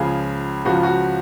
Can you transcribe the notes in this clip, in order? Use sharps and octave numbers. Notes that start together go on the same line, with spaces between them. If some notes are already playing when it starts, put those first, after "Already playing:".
Already playing: C#2 C#3 F3 G#4
C#2 C#3 F3 F#4
F4
F#4